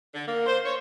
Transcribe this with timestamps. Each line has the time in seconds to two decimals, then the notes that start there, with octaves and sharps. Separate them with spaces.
0.14 D3
0.28 A#3
0.47 C5
0.66 C#5